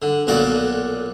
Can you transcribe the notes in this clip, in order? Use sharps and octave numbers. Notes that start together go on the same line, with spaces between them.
D3
B1 A#2 F#4 A4 D5